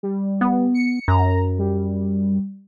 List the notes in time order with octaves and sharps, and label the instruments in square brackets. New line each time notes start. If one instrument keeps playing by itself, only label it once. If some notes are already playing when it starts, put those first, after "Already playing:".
[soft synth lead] G3
[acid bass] B3
[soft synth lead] C#7
[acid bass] F#2 [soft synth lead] A#5
[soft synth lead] G3